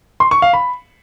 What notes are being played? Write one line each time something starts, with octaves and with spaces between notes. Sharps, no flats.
C6
C#6
F5
B5